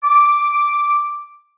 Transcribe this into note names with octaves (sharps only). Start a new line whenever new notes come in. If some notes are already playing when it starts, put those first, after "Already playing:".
D6